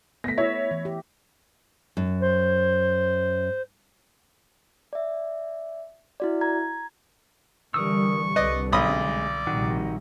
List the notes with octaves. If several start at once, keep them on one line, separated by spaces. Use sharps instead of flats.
A3 B3 A#6 B6
E4 C#5 E5
E3
G4
F#2
C5
D5 E5
E4 F#4 D5
A#5 G#6
D3 E3 G3 A#4 C#6 D#6 E6
C2 D3 B4 D5 D#5
B1 G#3 D5 D#5 B5 D#6
A#1 C3 D#3 G3 F#4